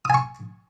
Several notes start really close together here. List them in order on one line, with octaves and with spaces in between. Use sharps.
D#6 G#5 C#6